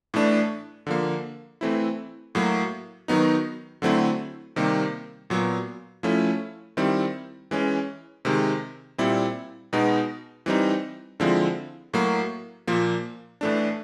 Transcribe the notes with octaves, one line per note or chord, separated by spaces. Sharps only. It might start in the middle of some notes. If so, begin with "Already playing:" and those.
A2 E3 A3 D4
D3 F3 A#3
E3 A3 C4 E4
A2 F#3 A#3
D#3 F#3 B3 D#4
D3 F#3 A3 C4 E4
C3 D#3 G3 A#3
A#2 F#3 B3
F3 A3 C#4 E4
D#3 G3 C4 E4
E3 G#3 C#4
C3 D#3 G#3
A#2 G3 C4 E4
B2 G#3 B3 D#4
E3 G3 C4 D#4
D3 F3 G#3 C4 E4
A2 F#3 A#3
A#2 F3 A#3
A2 E3 A3 D4